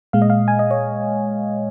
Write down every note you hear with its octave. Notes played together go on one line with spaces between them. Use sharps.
A#2 G#3 F5
D#5
F5
G#5
D#5
C#5